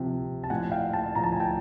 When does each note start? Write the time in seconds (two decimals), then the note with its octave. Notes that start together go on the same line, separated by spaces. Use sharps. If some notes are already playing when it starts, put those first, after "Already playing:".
Already playing: C3 F3
0.44 A5
0.50 A2 F3 F#5 G#5
0.72 F5 G5
0.93 G5 A5
1.15 A2 F3 A#5
1.23 A5
1.32 G#5
1.40 G5 A5